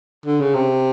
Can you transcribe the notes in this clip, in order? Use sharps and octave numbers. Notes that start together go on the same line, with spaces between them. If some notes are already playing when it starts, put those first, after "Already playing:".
D3
C#3
C3